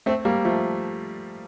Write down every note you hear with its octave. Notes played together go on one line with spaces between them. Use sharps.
A3 C4
G3 A#3
F3 A3